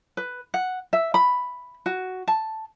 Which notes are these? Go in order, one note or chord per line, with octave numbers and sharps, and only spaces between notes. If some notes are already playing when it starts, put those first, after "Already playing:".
B4
F#5
E5
B5
F#4
A5